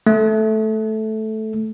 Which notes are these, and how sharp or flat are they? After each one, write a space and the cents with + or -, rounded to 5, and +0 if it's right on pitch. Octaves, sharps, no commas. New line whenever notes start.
A3 -10